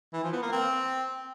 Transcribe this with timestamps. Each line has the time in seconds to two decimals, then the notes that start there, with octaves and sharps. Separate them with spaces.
0.13 E3
0.23 F3
0.33 B3
0.42 A#3
0.52 C4